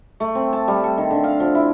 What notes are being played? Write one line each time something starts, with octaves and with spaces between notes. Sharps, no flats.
A3
C4
A5
G3
A4
D#3
D3
F5
F3
E4